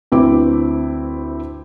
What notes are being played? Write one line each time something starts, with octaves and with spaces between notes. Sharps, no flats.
D2 C4 E4 B4 D6